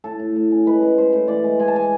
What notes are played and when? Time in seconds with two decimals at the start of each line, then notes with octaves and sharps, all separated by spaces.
0.04 A2 A4
0.19 A2
0.36 A2
0.51 C#4
0.66 G#3 B4
0.83 G#3
0.98 G#3 C5
1.13 A2
1.28 E3 D5
1.44 G#3
1.59 G#3 G#5
1.68 A5
1.75 G#3 G#5